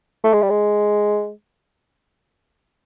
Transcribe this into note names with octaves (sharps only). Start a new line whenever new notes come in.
A3
G#3
G3
G#3